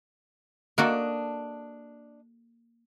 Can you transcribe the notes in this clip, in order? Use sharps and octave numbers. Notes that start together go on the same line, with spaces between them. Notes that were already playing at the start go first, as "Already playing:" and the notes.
A#3 D4 F#4 A4 D#5